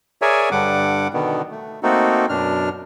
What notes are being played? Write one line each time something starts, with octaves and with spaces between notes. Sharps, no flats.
G#4 A#4 C#5 D5 E5 G#5
G2 D3 G3 F#5 D6
B2 D3 D#3 B3
A3
A3 A#3 C4 D#4 F#4 A4
F#2 B2 D4 F6